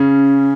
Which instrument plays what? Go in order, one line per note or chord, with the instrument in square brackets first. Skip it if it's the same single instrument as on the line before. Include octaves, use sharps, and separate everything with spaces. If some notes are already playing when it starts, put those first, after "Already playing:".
Already playing: [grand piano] C#3 [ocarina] C#4